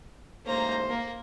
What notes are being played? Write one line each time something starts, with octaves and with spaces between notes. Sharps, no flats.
A1 G#2 A#3 C5 A#5
A#3 A#4